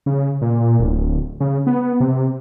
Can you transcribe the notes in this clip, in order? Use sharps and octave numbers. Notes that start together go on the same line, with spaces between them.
C#3
A#2
D1
C#3
B3
C3